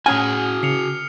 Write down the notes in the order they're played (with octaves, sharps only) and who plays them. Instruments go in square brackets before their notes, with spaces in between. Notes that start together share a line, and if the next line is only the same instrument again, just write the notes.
[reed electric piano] A2 C#4 F#5 [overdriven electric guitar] F#4 G#4 [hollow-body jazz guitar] G#5 [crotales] D#6 F6
[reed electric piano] C#3 [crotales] C7 C#7 F7